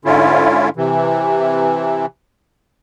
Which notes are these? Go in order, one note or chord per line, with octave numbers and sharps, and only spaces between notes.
G#2 D3 C#4 E4 F4
C3 E3